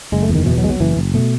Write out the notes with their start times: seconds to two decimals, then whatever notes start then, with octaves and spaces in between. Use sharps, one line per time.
0.12 F#1 G#3
0.22 A3
0.29 E2
0.35 D#3
0.46 B2 E3
0.58 F#3
0.63 B1 G#3
0.69 F#3
0.80 F#1 E3
0.97 F#1
1.14 B2 A3